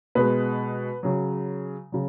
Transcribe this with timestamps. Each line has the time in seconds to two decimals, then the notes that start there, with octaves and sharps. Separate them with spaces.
0.15 B2 G#3 B4
1.03 C#3 F#3
1.92 C#3 F#3